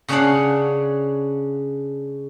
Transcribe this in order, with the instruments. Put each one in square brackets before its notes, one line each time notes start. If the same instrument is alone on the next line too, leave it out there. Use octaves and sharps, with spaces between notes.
[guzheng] C#3 C#4 D4 C#5 F5 F#5